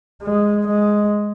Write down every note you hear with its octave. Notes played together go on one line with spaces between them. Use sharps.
G#3
G#3